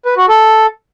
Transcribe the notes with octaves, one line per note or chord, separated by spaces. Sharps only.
B4
F#4
A4